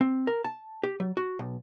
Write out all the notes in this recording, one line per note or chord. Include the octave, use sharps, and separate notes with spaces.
C4
A#4
A5
G4
F#3
F#4
B1